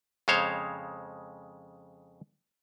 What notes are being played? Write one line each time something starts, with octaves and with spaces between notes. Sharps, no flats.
F2 C#3 G#3 C5 C#5 F5